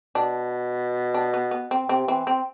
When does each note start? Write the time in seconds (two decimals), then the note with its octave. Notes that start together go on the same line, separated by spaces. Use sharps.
0.15 B2 D4
1.14 D4
1.33 B3
1.51 B3
1.71 C4
1.89 C3 C4
2.07 E3 C4
2.27 C4